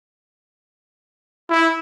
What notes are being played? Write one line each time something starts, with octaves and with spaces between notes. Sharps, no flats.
E4